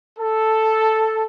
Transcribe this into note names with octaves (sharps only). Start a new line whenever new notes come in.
A4